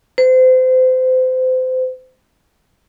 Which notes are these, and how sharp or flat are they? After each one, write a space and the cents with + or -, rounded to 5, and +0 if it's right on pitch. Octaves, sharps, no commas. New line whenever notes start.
C5 -30